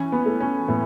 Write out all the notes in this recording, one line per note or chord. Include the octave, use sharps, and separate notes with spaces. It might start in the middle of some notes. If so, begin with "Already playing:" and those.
Already playing: E3 C#4
B3
A3
C#4
A2 B3